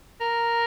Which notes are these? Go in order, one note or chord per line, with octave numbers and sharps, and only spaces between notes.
A#4